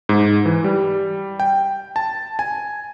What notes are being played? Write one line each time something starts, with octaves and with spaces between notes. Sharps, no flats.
G#2
E3
G3
G5
A5
G#5